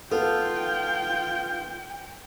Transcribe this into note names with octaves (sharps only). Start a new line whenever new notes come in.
B3 F4 A4 G5